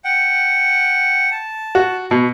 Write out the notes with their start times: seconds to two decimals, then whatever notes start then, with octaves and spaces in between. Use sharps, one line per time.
0.05 F#5 G5
1.31 A5
1.75 F#4
2.11 B2